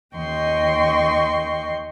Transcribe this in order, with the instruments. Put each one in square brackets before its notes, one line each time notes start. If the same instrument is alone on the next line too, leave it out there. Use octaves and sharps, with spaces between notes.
[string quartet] D#2 D#5 G5 C6 C#6